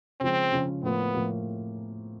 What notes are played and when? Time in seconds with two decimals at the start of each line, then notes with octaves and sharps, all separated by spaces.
0.21 C#3 F3 G#3 C4 C#4
0.52 C#3 F3 G#3 C#4
0.83 A2 F3 A#3 B3
1.14 A2 F3 A#3